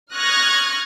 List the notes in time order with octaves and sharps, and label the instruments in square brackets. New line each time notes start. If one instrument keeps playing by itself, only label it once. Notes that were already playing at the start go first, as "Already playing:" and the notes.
[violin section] C#6 D#6 F6 F#6 G#6 A#6